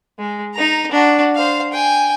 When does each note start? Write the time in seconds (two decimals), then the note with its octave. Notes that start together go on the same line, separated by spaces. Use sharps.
0.19 G#3
0.55 D#4 A#5
0.92 D4 F#4
1.36 C5 F5
1.73 G5 G#5